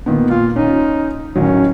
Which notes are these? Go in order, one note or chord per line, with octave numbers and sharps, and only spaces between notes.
A#2 D#3 B3
A#2 F4
C#4 D#4
A1 D#3 F#3 C#4